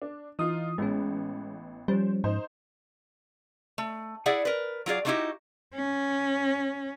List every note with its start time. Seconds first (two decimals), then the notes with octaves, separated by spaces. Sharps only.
0.02 D4
0.39 E3 D#4 F4 D#6
0.78 A1 G#3 B3 C#4
1.88 F3 G3 C#4 C5
2.24 G#2 D#4 C5
3.78 A3
4.26 E4 G#4 D5 E5 F#5
4.45 A#4 B4
4.86 F#3 F4 G#4 D5
5.05 A3 A#3 D#4 E4 F#4 G4
5.75 C#4